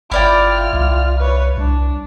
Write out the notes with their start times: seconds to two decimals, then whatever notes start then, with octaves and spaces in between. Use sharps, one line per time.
0.11 G1 E4 F4 D5 G5 F6
0.73 C2
1.18 B4 C#5
1.57 C2 D4